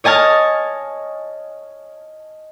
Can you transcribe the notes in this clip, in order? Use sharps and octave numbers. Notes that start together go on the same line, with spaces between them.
C#5 D#5 G#5 A5 F6